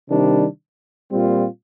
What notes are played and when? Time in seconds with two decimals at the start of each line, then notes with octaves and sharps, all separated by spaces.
0.10 C3 D#3 G3 D4
1.11 A#2 G3 C4 F4